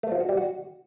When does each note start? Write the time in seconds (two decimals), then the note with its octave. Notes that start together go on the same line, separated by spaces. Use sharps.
0.03 A3
0.12 F3
0.20 F#4
0.29 G3
0.37 F#4